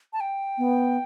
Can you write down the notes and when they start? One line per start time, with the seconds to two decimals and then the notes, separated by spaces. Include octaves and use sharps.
0.13 A5
0.20 G5
0.58 B3